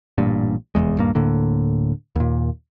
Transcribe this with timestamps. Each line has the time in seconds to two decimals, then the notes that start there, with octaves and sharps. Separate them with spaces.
0.18 A1 G2 A#2
0.75 F1 B1 E2 G#3
0.97 D#1 G2 A#3
1.15 D1 A2 D3 A#3
2.16 D#2 A#2